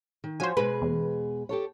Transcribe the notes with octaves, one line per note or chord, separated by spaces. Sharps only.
D#3
F3 F#4 C5 C#5 G#5
B2 G#3 G#4 B4
E2
G4 A4 C#5